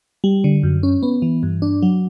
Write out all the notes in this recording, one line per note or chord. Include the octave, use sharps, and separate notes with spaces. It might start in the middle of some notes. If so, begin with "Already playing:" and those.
G3
D3
F#2
C#4
B3
E3
G2
D4
F#3